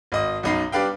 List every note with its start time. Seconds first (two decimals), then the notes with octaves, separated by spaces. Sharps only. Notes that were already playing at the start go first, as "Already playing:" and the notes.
0.12 G#1 D#5 D#6
0.43 B1 F#2 D#4 B5 C7
0.72 G3 D4 B4 F5 G5